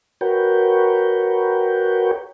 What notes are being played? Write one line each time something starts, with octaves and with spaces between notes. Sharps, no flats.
F#4 A#4 B4 C#5 G5